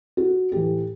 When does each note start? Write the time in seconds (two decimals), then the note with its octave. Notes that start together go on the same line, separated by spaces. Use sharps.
0.17 F#4
0.52 A2 E3 G4